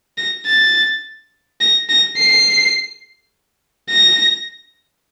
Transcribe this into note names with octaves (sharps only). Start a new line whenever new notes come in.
A#6
A6
A#6
A#6
C7
A#6